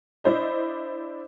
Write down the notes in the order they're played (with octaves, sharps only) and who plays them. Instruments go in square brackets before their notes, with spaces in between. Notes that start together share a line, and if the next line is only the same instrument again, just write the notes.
[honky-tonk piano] D4 E4 C5 D#5